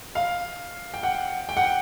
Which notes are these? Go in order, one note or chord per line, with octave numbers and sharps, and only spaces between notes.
F5
G5
F#5
G5
F#5